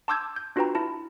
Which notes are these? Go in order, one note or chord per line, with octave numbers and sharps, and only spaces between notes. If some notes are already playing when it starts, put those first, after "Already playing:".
A5 C6 D6 E6 G6 G#6
G6
D4 F4 F#4 B4 G5 A#5
E4 A5